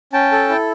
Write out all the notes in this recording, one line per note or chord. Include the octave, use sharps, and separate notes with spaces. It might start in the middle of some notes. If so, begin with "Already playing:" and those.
C#4 G5 A5
A4
E4